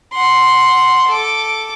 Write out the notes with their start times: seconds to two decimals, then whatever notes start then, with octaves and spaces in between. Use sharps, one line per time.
0.13 F#5 C6
1.08 A4 D6